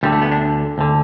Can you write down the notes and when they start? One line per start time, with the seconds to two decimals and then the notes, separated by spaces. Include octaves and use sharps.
0.03 D2 D3 G3
0.12 A3
0.22 B3
0.31 D4
0.78 D2 D3